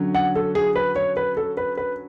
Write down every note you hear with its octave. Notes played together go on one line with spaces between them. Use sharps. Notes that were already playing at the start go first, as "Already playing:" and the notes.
Already playing: D3 F#3 C#4
F#5
A4
G#4
B4
C#5
B4
A4
B4
B4